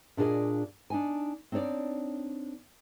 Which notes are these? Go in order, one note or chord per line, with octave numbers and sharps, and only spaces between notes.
A#2 D4 F4 G#4 D#5 F5
D4 D#4 G#5
C4 D4 D#4 C#5 D5